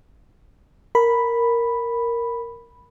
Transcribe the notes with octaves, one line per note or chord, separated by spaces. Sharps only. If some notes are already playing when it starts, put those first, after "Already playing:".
A#4 B5